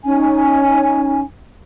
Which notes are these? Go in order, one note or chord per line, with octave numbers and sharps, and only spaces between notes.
C#4 D#4 G#5